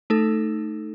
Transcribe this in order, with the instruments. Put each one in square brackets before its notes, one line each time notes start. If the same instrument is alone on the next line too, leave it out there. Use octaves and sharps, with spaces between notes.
[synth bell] A3 D#4 A4